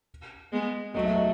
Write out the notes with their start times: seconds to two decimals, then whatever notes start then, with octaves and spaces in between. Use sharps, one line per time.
0.52 G#3 B3
0.94 F#3 A3 D#5
1.05 E5
1.16 D#5